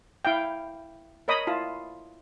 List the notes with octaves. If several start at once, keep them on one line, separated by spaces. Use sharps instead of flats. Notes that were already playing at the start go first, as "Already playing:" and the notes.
E4 F5 G5
A#4 C#5 D#5 B5 D#6
E4 F4 A5